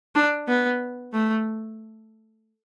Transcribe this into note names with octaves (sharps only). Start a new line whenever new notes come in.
D4
B3
A3